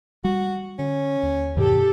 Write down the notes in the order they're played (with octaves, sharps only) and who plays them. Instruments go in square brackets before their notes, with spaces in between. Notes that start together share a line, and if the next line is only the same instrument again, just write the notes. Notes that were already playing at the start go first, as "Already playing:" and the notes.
[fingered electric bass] G3 [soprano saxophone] F#4
[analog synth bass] D3 [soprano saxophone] C#4
[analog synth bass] D#2
[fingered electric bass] G2 B2 D#3 [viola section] G4 A4